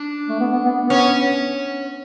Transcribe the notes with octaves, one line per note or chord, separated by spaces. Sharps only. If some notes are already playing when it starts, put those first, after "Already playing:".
Already playing: D4
A3
B3
B3
B3
B3
C#4